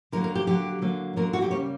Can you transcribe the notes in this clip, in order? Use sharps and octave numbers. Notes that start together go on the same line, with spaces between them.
D3 F#3 A#3 A#4
A#4
G4
D3 F#3 A#3 G4
D3 F#3 A#3
D3 F#3 A#3 A#4
F#4
G4
C#3 G3 A#3 C#5